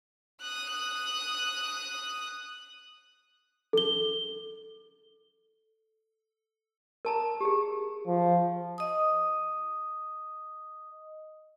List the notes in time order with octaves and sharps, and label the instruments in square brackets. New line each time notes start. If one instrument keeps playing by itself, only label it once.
[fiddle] D#6 F#6
[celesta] A4 G7
[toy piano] A#4 A5 A#5
G4 G#4
[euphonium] F3
[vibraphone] D#5 D#6